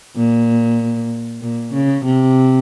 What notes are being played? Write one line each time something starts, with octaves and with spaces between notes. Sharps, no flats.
A#2
A#2
C#3
C3